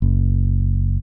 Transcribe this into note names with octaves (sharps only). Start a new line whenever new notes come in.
F#1